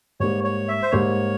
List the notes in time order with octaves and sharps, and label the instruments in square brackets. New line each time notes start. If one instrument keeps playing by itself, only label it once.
[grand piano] G#2 G3 A#3 [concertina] C#5
[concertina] C#5
E5
C5
[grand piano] G#2 G3 A#3 [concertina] C#5